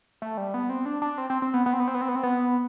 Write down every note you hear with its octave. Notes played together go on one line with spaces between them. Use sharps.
A3
G3
B3
C4
D4
D4
C4
C4
C4
B3
B3
C4
B3
C4
B3
C4
B3
C4
B3